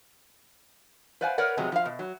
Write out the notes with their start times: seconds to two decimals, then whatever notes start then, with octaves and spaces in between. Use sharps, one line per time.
1.21 B4 C5 D5 F5 F#5 G#5
1.38 A#4 B4 C#5 D5 F#5
1.57 C3 F3 F#3 G#3 B3
1.72 F3 F5
1.85 B2
1.99 F#3